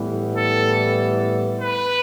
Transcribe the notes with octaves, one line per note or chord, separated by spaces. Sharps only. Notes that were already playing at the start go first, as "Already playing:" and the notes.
Already playing: A2 E3 G3 B3
A4
B4